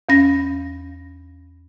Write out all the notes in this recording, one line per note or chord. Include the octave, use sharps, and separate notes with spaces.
E2 C#4 A#6